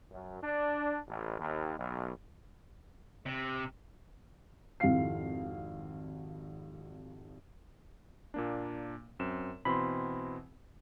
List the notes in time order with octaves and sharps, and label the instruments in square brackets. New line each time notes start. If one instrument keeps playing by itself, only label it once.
[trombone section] F#2
D4
A1
D#2
B1
[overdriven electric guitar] C3
[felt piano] G#1 F2 C3 E4 F5 C7
[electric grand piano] A#2 A#3 D4
F#2 C4 E7
[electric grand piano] B2 E3 C4 [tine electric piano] B5 C6